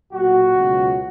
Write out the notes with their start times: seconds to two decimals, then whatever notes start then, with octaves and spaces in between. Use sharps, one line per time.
0.12 B1 A#2 F#3 F#4
0.53 C#2 B2 F#3